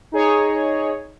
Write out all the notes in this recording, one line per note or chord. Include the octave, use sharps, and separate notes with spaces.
D#4 G#4 C#5